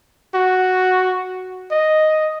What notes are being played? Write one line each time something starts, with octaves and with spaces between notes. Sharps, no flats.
F#4
D#5